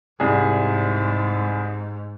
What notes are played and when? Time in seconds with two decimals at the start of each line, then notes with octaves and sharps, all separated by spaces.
0.20 C2 G#2 G#4